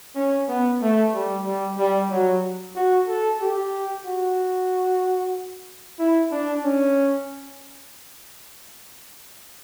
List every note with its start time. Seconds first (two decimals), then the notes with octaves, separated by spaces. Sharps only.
0.15 C#4
0.48 B3
0.81 A3
1.13 G3
1.45 G3
1.77 G3
2.10 F#3
2.75 F#4
3.07 A4
3.40 G4
4.05 F#4
5.99 E4
6.31 D4
6.64 C#4